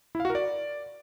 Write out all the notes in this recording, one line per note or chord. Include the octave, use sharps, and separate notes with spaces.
E4
F5
F#4
A#4
D5